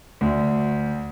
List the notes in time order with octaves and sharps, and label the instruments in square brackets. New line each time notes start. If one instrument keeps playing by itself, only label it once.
[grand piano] D2